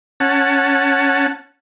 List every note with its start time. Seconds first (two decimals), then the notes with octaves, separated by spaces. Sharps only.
0.20 C#4 F#5 A5